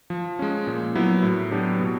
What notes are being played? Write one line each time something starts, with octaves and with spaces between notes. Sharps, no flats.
F3
G#3 C#4
A#2
F#3 B3 E4
A2
F#3 B3 D4 G4
B2